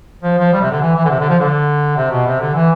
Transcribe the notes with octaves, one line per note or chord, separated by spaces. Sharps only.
F3
F3
G3
C3
D3
E3
E3
D3
C3
D3
F3
D3
C3
B2
C3
D3
E3